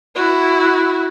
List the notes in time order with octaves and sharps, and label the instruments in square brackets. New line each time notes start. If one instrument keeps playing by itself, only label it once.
[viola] E4 F#4